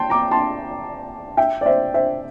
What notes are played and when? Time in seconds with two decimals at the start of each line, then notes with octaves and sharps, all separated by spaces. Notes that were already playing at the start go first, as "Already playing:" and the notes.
Already playing: G5 A5 C6
0.10 A#5 D6
0.31 A5 C6
1.37 E5 G5
1.61 D5
1.66 C5 E5
1.94 C5 E5